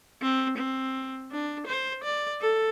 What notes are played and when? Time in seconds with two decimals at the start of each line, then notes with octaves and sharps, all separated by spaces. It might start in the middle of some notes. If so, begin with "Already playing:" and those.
0.22 C4
0.57 C4
1.31 D4
1.67 C5
2.04 D5
2.41 A4